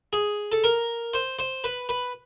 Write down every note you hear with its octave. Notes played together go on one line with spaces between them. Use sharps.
G#4
A4
A#4
C5
C5
B4
B4